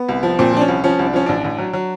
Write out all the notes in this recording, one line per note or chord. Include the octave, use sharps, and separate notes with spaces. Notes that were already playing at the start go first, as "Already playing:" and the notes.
Already playing: B3
C2
F3
A#2 C4
F3 D4
C#4
C2
F3 C#4
C2
D4
F3 C#4
A1 D4
A1
F#3
F#3